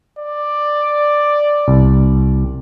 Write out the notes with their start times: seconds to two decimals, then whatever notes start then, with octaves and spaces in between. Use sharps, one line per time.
0.19 D5
1.68 C2